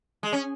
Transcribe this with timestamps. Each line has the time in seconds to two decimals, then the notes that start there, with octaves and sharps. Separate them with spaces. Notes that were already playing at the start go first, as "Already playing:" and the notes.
0.23 G#3
0.33 C#4